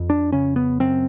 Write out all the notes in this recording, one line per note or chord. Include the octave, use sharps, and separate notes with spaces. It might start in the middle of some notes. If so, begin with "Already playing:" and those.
Already playing: F2
D4
C#3 C#4
B3
F#2 C4